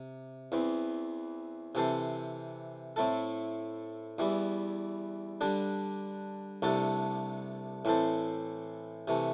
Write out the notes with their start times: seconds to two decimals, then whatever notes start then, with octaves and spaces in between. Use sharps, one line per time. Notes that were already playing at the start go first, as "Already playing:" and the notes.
Already playing: C3
0.52 E2 E3 C4
1.75 C3 E3 C4 A4 C5
2.96 A2 A3 C4 E4 A4
4.19 E2 E3 G3 E4
5.41 D3 G3 D4
6.62 C2 C3 A3 D4 A4
7.85 A2 E3 C4 A4 C5
9.08 C3 E3 A3